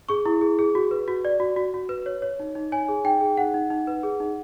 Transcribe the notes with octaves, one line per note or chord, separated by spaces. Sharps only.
G#4 C#6
E4
G#4
G#4
F#4
B4
F#4
D5
F#4
F#4
F#4
B4
C#5
C#5
D#4
D#4
C#5 G#5
G#4
D#4 G5
G#4
D#4 F#5
D#4
D#4
B4
G#4
D#4